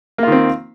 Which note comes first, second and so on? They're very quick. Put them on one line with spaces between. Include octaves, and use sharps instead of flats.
A#3 F4 D#3 C4